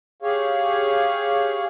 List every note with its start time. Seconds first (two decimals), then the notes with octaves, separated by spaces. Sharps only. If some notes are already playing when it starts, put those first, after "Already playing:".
0.22 G4 G#4 C#5 F5